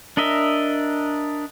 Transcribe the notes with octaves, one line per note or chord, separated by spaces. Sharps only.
D4 A#4 D#5 E5